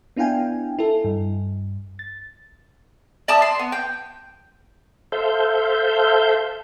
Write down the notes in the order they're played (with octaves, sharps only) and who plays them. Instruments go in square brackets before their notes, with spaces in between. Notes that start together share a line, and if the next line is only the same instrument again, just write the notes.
[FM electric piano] B3 D4 E4 F5 G5 G#5
E4 A4
G2
A6
[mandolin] D5 E5 A5 D#6
C6
B3
G5
[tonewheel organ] A4 C5 E5 F5 G6